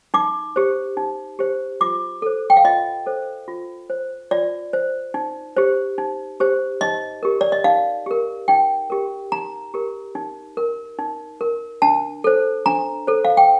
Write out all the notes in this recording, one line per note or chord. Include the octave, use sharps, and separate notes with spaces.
D#4 D6
G4 C5
D#4
G4 C5
F4 D6
A4 C5
G5
F5
F4 D#5
A4 C5
F4
C5
F4 D5
C5
D#4
G4 C5
D#4
G4 C5
D#4 D#5
G4 A#4
D5
D#5
D#4 F5
G4 A#4
D#4 G5
G4 A#4
D#4 A#5
G4 A#4
D#4
A#4
D#4
A#4
D4 A5
A4 C5
D4 A#5
A4 C5
F5
G5